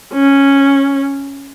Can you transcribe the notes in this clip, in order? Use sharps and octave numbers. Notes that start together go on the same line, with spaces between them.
C#4